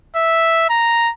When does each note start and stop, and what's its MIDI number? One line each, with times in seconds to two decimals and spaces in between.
0.16 0.69 76
0.70 1.11 82